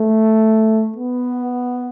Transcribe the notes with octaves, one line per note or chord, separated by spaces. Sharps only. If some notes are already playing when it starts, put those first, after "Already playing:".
Already playing: A3
B3